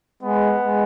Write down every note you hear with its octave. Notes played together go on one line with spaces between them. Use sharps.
G#3 B3
G#3